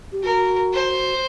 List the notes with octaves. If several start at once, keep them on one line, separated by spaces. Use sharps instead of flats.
G4
F#4 A#4
C5